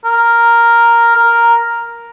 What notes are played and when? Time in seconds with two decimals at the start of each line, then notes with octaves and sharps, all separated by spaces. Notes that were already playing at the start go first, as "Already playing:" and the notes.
0.05 A#4
1.15 A#4